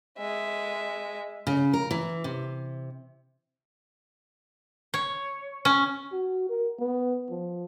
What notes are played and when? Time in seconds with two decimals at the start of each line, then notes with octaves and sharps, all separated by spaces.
0.18 G#3 E5
1.47 C#3
1.73 A#4
1.91 E3
2.24 C3
4.94 C#5
5.65 C#4
6.12 F#4
6.50 A#4
6.79 B3
7.30 F3